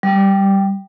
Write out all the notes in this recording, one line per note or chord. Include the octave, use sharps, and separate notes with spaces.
G3